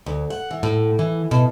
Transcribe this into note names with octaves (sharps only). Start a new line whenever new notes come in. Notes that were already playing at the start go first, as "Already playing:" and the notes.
D2
F#5
E3
A2
E3
B2